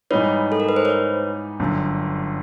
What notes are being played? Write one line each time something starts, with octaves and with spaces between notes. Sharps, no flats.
G#2 E3 G3 B3 D#4 B4 C#5
A4
A#4
B4
C5
B4 C#5
G1 F#2 D3